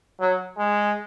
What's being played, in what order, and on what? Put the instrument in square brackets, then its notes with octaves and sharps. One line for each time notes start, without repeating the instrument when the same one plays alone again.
[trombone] F#3
G#3